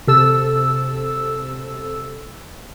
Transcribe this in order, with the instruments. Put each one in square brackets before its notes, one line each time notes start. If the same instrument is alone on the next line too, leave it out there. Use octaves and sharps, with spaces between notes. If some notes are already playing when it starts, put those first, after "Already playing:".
[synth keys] C3 A4 E6